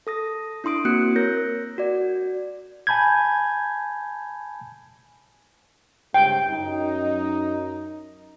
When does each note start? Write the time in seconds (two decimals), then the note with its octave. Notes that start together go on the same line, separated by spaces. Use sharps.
0.07 A4 D#6 A#6
0.64 D4 E4 C6 D#6 D7
0.85 A#3 C4 F#4 F#6 C#7
1.16 A#4 C#5 G6 A#6
1.78 F#4 D5
2.87 G#5 A5 B5 G6 G#6
6.14 C#2 G2 C3 G5
6.50 F#2 D#4